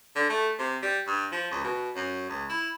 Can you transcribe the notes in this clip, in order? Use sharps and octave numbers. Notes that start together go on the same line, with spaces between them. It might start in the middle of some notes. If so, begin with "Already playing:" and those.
D3
A3
C3
G3
G2
F3
C#2
B2
F#2
C#2
E4